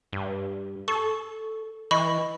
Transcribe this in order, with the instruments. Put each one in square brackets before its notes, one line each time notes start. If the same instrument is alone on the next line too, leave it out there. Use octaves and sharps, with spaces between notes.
[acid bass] G2
[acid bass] A4 [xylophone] C#6
[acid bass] E3 [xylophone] D#5 B5 C#6